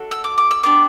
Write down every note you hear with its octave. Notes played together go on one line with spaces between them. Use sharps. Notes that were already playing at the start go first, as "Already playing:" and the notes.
Already playing: A3 D4 F#4 A4
E6
D6
D6
E6
B3 D4 G4 D6